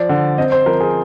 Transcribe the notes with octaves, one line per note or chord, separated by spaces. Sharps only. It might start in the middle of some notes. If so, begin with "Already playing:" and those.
Already playing: F3 D5
D3
C4 D#5
C5
F3 A#4
G#4